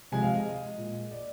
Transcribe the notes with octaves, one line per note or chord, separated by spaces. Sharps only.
C3 F3 G#3 G#5
F5
D#5
A#2 G#3
D5